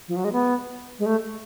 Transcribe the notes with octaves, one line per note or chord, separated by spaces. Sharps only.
F3
F#3
G#3
B3
G#3
A3